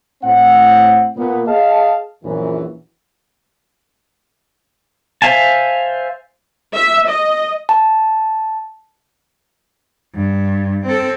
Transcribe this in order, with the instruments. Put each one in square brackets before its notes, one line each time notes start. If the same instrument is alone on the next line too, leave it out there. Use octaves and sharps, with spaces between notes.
[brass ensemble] A2 C4 F#5
A#2 B3
G#4 D#5 F5 A5
A#1 F#2 E3
[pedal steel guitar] C5 E5 F5 G#5 A5
[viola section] E5
D#5
[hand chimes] A5
[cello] G2
C4 A4